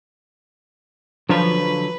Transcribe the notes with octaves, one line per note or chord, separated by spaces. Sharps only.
D3 F3 F#3 D4 B4 C#5 A#5